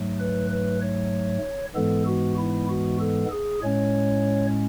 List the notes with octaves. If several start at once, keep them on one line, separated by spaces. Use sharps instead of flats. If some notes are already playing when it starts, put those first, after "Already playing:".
Already playing: G#2 F#3 A3
B4
B4
C#5
G#2 E3 G#3 B3 A4
F#4
E4
F#4
A4
G#4
A2 G#3 C#4 C#5